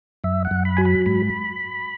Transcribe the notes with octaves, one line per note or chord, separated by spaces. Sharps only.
F#2 E5
F#5
F#2
B5
F#3 G#5
B5
G#2 B5